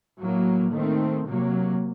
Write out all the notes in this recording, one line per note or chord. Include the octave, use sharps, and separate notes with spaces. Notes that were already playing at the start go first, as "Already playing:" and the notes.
A2 F#3 A#3
D#3 A3 C4
C3 F#3 A#3